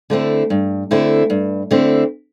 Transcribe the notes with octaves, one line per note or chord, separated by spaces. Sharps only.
D3 A3 C4 E4
G2
D3 A3 C4 E4
G2
D3 A3 C4 E4